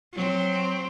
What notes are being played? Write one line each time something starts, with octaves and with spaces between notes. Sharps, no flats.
F#3 C4